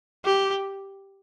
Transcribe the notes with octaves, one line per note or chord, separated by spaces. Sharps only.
G4